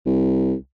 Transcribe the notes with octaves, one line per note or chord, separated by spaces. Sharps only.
C2